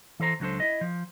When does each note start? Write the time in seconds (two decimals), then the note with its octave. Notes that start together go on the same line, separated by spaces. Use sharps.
0.20 E3 A4 C5 A#5
0.40 C#2 F#3 D4 A4 C5
0.60 E4 D#5
0.81 F3